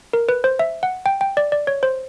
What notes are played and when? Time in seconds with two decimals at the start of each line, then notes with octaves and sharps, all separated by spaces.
0.13 A#4
0.29 B4
0.44 C5
0.59 E5
0.83 F#5
1.06 G5
1.21 G5
1.37 D5
1.52 D5
1.67 C#5
1.83 C5